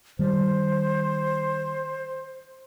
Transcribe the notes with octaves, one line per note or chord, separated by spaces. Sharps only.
D#3 G3 C5